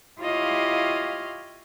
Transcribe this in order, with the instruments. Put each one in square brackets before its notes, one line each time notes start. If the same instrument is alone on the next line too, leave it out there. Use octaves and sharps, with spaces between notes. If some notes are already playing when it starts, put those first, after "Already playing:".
[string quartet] E4 F4 G4 C#5 D#5 F5